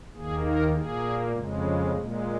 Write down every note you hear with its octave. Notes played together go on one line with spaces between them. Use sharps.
D#2 D#3 A#3 G#4
A#4
A#2 A#3 G#4
F2 C#3 G#3
A#2 G#3